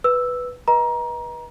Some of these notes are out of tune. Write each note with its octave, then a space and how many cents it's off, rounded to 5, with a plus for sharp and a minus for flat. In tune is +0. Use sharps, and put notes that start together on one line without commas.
B4 +0 E6 +0
B4 -30 D#5 +20 A#5 +25